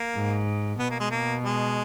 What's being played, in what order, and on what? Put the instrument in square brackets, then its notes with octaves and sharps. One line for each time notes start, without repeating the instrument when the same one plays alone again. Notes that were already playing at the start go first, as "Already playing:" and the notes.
Already playing: [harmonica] A#3
[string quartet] G#2
[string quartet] B2 [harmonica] B3
[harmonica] A#3
G#3
A#3
G#3